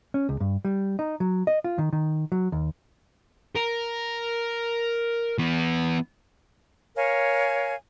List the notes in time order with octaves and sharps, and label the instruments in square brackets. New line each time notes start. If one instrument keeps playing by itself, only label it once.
[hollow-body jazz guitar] C#4
C#2
G2
G3
D#4
F#3
D#5
F4
D#3
D#3
F#3
D#2
[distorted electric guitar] A#4
E3 B3
[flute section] A#4 C#5 F5 G#5